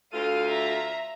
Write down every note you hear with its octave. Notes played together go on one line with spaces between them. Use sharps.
D2 F4 A4 F5 D#7
E5 A#5